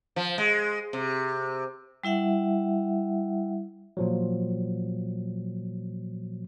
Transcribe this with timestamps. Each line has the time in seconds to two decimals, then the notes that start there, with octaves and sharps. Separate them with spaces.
0.16 F3
0.38 G#3
0.93 C3
2.03 G3 E4 E5 F#5
3.97 A#2 F3 F#3